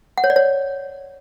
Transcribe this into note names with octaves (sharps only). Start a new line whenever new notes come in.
F#5
C#5
D5
C#5